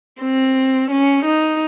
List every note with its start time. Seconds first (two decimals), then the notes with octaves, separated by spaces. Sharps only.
0.21 C4
0.90 C#4
1.25 D#4